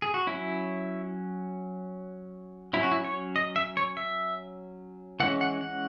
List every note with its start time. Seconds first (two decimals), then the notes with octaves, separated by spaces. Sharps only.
0.02 G#4
0.14 F#4
0.27 F#3 C#4 E4
2.73 F#3 C#4 E4
2.83 F#4
2.92 E4
3.04 C#5
3.36 D#5
3.56 E5
3.77 C#5
3.97 E5
5.20 E3 G#3 C#4 F#5
5.41 F#5
5.61 F#5